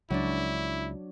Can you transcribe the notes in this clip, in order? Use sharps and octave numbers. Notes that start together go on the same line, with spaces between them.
C#2 F#3 D4 E4